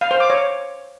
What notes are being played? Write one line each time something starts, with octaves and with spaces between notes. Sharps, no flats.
F5
C5
D6
C#5